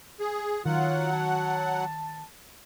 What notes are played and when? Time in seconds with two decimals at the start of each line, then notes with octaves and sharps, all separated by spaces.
0.20 G#4
0.65 D#3 F#3 F4 F#5
1.13 A5